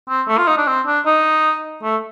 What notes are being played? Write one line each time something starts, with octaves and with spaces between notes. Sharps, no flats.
C4
A3
F4
D#4
D4
C4
D4
D#4
A3